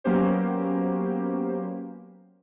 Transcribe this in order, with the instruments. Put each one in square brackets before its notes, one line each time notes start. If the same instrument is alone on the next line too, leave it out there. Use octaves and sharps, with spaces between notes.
[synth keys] F#3 A#3 B3 C#4 G4 C5